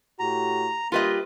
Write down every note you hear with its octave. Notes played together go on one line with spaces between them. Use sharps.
A2 F#4 G4 A#5
G3 A#3 F4 G4 B4 D#5